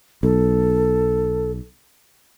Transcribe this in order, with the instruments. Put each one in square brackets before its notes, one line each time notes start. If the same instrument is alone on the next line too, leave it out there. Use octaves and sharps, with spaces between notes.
[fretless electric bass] B1 [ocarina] A4